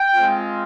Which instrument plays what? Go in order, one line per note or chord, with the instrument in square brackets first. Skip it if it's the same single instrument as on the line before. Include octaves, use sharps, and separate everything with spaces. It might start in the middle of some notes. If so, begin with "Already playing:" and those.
Already playing: [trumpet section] G5
G#3 C4 F4